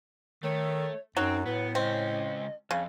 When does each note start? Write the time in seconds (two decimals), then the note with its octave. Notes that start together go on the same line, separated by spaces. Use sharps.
0.43 D#3 A3 C#5
1.17 F#2 F#3 C4 D#4
1.46 A2 B3 B4
1.75 C#2 C4 C#4 D#5
2.71 F2 C#3